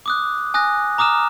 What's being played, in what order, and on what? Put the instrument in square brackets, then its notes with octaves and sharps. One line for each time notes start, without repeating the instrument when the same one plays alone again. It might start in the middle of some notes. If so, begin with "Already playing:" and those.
[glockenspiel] D6 D#6 F#6
G#5 D#6 F#6 A#6
A#5 D6 D#6 F6 E7